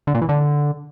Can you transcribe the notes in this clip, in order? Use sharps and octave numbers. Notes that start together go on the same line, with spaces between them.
D3
A#2
E3
D3